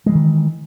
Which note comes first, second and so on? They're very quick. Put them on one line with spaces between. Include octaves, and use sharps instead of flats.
G#3 G3 E3 D#3